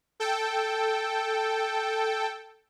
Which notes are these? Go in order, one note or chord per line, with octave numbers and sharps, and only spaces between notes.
A4 G5